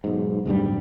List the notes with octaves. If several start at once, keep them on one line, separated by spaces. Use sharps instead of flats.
B1 G#2
D1 B1 G2 G3